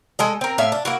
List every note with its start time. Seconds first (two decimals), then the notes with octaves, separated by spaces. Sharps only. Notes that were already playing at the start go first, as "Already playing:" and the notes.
0.19 G#3 A4 D#5
0.41 C4 A#4
0.58 A2 E5 F5
0.72 D4
0.85 A#3 E4 F#4